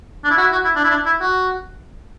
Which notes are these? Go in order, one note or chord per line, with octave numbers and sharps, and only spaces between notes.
D4
E4
F#4
E4
F#4
E4
D4
E4
D4
E4
F#4